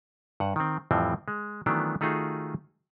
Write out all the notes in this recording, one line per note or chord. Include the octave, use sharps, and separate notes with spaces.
G2 F#5
D#3 C4
F2 A2 E3 F3 G3 C4
G#3
D#3 E3 F#3 A3 B3 D4
D#3 A3 D#4 F4 F#4 G#4